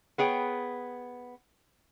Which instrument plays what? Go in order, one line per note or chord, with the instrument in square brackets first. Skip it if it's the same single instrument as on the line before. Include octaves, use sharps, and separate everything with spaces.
[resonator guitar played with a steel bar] B3 G#4 C#5 G5